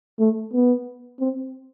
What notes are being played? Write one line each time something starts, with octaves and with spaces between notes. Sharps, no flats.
A3
B3
C4